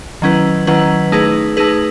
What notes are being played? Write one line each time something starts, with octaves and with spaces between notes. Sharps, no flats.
D#3 F#3 C#4 E4 B4
D#3 F#3 C#4 E4 B4
A3 D#4 G#4 B4
A3 D#4 G#4 B4